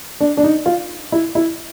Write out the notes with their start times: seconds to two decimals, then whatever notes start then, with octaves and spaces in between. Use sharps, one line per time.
0.20 D4
0.37 D4
0.43 D#4
0.66 F4
1.12 E4
1.35 E4